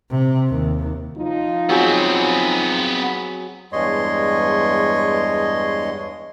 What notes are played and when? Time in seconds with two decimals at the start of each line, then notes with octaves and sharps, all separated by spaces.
0.10 C3
0.49 D#2
1.16 F3 D#4 F4
1.69 F#3 B3 C4 G#4
3.73 E2 G2 G#3 C#5 D#5 C6